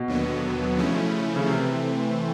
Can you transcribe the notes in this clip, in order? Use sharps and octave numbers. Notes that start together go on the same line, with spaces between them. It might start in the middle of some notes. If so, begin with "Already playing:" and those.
Already playing: B2
D#2 D3 F#3 B3
C#3 F3 A3 C#4 E4
C#3
C3 E3 A3 C4